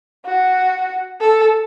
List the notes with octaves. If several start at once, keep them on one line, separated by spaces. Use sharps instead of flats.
F#4
A4